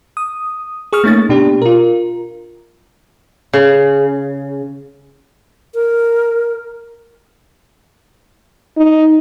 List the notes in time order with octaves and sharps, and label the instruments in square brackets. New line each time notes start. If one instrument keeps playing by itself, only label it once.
[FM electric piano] D#6
G#4 C#6 D#6 F6
A3 A#3 C#4 D#4 A6
B2 D4 G4
F4 A#4
[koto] C#3
[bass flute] A#4
[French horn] D#4